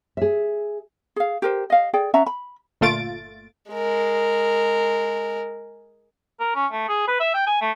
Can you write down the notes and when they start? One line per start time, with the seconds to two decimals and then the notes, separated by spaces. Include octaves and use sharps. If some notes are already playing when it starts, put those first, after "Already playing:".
0.17 G#4 E5
1.16 G#4 F5
1.42 G4 A#4 C5
1.70 D#5 F5
1.94 G#4 D5 G5
2.14 C#4 E5 F#5 A#5
2.26 B5
2.81 G1 A#2 A3 F4 A6 D7
3.71 G#3 A#4
6.40 A#4
6.55 C#4
6.72 A3
6.89 G#4
7.07 B4
7.20 E5
7.34 G5
7.47 G#5
7.61 A3